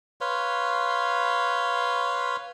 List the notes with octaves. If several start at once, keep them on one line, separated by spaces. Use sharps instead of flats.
B4 C#5 F5 C6